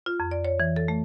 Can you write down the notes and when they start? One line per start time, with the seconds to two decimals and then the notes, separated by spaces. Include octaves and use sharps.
0.06 F4
0.20 F2
0.31 D5
0.45 C#5
0.60 E3
0.76 A4
0.88 A3